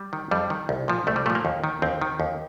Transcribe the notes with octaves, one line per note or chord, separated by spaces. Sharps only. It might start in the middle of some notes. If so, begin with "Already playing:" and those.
Already playing: G3
D#3
F2 G3
D#3
C2
A#2 F3
C2 A3
G3
A#2 F3 A3
A#3
D#2
D#3
D#2 C4
D#3
D#2